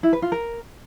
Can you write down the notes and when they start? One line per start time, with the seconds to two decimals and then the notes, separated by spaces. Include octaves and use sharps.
0.03 E4
0.13 B4
0.22 F4
0.32 A#4